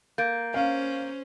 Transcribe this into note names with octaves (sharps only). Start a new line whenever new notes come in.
A#3 G6 A6 D7
C#4 C5 F5